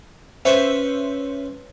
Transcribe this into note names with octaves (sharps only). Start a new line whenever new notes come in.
C#4 B4 C5 E5 C#6